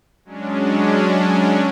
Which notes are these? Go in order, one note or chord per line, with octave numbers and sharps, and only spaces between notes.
F#3 G#3 C#4 D4